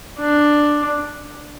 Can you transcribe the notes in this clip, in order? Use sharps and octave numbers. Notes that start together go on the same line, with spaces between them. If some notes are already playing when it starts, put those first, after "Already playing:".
D4